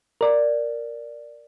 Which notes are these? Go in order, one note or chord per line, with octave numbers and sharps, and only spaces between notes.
A#4 D5